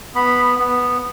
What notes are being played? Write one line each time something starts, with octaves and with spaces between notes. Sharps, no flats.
B3 B5
B3